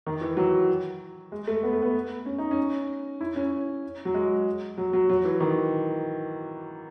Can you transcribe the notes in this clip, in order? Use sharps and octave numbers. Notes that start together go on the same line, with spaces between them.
D#3
E3
F#3
G#3
A3
B3
A3
B3
C#4
D#4
C#4
E4
C#4
F#3
G#3
F#3
F#3
F#3
E3
D#3